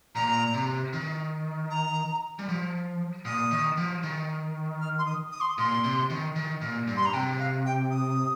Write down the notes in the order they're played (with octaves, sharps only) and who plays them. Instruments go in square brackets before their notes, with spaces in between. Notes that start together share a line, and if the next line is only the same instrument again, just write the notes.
[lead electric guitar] A#2 [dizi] A#5
[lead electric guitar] C3
D#3
[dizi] A#5
[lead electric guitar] G3
F3
[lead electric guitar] A#2 [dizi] D#6
[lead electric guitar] D#3
F3
D#3
[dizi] F6
C6
D#6
D#6
C6
D#6
[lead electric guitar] A#2 [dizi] C6
[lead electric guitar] C3
D#3
D#3
A#2
G2
[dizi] C6
A#5
[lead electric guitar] C3 [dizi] G5
[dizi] F5
G5
D#6